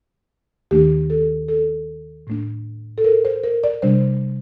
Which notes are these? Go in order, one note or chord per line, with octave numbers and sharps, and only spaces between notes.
D#2 D#3 A3 D4 G4
A4
A4
A2 A3 D4
A4
A#4
C5
A#4
D5
C3 G3 D4 C5